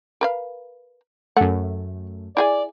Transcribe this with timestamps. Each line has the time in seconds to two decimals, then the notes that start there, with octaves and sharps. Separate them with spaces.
0.21 A#4 B4 F5
1.37 F#2 A3 F#5
2.37 E4 G#4 D5 G#5